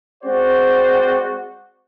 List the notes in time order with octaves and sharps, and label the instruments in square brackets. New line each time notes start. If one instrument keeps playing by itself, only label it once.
[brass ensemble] G#3 C4 F#4 C5 D5